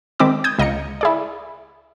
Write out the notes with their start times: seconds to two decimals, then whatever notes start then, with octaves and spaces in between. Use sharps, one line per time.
0.19 D#3 G#3 C4 B5 D6 E6
0.44 D#6 G6 G#6
0.59 C#2 D#5 F5 A#5 C#7
1.01 E4 G#4 D5